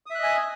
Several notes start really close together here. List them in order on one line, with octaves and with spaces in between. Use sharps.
D#6 E5 F#6 D#5 G#5